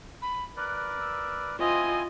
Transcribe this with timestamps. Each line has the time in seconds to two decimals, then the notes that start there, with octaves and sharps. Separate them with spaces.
0.22 B5
0.57 A#4 B4 D5 F#6
1.01 E6
1.60 C4 E4 F4 C5 D#5 G#5